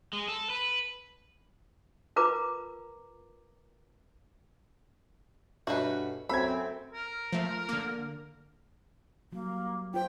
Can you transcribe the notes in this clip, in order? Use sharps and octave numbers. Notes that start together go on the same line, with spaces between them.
G#3
A4
B4
F4 A#4 B4 A#5 D6
G2 B2 A3 C#4 F#4 B4
F#2 A3 C4 B5 E6 G#6
A#4
F3 A3
D3 A#3
F#3 G3 A#3
F4 C5 G5